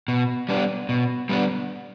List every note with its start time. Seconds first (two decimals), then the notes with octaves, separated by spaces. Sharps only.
0.08 B2
0.49 G3 B3 D4
0.89 B2
1.29 G3 B3 D4